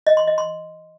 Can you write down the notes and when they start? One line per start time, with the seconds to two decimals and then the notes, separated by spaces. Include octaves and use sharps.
0.07 D#5
0.17 C6
0.27 D#5
0.38 C6